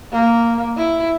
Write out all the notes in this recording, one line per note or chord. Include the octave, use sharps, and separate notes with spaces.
A#3
E4